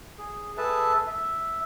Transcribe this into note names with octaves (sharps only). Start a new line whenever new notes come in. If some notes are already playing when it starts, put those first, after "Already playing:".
G#4
G#4 A4 B4 E5 A5
E5